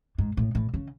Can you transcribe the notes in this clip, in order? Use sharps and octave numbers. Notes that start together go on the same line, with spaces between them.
G#2
A2
A2
C#3